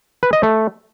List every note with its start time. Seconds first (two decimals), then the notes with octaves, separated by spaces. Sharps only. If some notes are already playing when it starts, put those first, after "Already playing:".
0.23 B4
0.33 D#5
0.43 A3